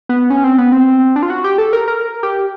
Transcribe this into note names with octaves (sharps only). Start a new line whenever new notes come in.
B3
C#4
C4
B3
C4
D4
F4
F#4
G4
A4
A#4
A#4
A#4
G4